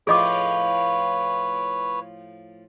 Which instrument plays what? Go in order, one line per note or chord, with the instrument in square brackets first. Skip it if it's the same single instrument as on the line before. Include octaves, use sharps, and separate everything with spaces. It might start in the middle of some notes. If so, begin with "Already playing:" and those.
[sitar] A2 F3 F4 [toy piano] G#4 D#5 D6 [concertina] B4 C#5